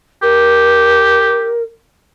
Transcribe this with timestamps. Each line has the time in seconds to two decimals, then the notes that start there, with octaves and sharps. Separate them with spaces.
0.23 G4 A#4